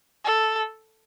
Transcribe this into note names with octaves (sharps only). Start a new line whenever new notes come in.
A4